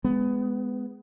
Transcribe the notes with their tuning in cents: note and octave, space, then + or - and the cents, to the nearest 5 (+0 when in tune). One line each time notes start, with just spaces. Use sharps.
G#3 +0 B3 +20